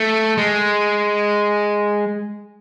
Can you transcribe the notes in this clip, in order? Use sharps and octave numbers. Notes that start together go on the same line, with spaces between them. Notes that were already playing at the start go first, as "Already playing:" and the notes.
Already playing: A3
G#3